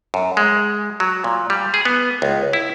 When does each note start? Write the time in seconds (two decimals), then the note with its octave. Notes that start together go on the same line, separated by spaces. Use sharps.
0.14 F#2
0.37 G#3
1.00 F#3
1.24 A#2
1.50 G3
1.74 G#4
1.85 B3
2.22 C#2
2.53 E4